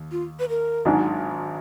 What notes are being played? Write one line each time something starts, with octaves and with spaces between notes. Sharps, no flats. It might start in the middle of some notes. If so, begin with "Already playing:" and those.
Already playing: D#2
F4
B4
A#4
G#1 G#2 D#3 F#3 D4